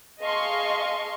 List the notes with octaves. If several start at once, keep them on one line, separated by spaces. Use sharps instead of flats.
G#4 D#5 F5 A5 C6 C#6